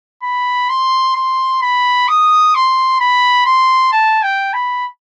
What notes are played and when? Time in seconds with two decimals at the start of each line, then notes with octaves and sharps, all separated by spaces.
0.23 B5
0.69 C6
1.15 C6
1.62 B5
2.08 D#6
2.55 C6
3.00 B5
3.46 C6
3.92 A5
4.23 G5
4.54 B5